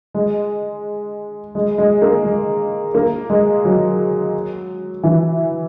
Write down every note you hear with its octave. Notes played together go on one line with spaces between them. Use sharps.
G#3
G#3
G#3
A#3
G#3
A#3
G#3
F#3
E3